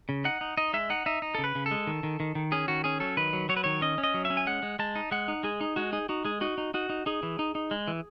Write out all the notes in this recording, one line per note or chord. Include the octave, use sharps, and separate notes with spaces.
C#3
D#4 F#5
D#4
D#4 D#5
G#3 E5
D#4 F#5
D#4 E5
D#4
C#3 A4
B4
C#3
A4
G#3
D#3
D#3
D#3
D#3
C#4 G#4
D#3 F#4
C#4 G#4
F#3 A4
D#3 B4
F#3
F#3 C#5
B4
D#3 C#5
C#4 D#5
C#4
D#5
F#3
E5
C#4
G#5
G#3 F#5
G#3
G#3 A5
D#4
G#3 F#5
D#4
G#3 G#4
D#4
G#3 F#4
D#4 G#4
D#4 F#4
G#3 G#4
D#4 F#4
D#4
D#4 F#4
D#4
D#4 G#4
E3
D#4
D#4
G#3
E3